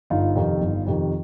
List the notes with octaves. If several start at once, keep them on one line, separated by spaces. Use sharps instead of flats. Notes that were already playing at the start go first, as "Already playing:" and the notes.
G1 D#4 F4
F2 C3 D#3
G1
F2 C3 D#3